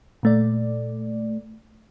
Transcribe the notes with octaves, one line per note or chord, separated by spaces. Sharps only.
A#2 A3 D5